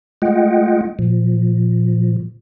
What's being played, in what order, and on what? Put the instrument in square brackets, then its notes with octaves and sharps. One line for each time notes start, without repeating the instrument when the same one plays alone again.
[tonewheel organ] G#3 A3 F4 D#5 F#5 G5
A#2 F3